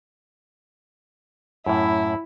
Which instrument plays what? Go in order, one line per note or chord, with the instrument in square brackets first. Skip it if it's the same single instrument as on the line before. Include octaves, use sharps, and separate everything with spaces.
[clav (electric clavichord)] F#2 A2 [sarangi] E4